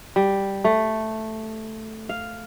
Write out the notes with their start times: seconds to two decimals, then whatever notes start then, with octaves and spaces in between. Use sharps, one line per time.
0.16 G3
0.64 A3
2.09 F5